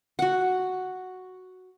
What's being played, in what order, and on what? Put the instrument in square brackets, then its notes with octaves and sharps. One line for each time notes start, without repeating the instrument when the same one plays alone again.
[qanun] F#4 F#5